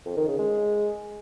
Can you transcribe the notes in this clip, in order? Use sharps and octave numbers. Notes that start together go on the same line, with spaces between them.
F2
D#3
C#3
G#3